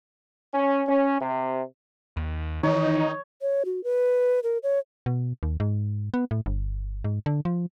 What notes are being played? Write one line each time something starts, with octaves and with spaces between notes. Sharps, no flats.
C#4
C#4
C3
D#2
D#3 E3 D#4 C#5
C#5
F#4
B4
A#4
C#5
B2
D#2
G#2
B3
A2
G1
G#2
D3
F3